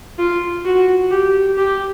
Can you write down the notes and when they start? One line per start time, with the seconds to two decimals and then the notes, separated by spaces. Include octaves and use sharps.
0.19 F4
0.65 F#4
1.11 G4
1.57 G4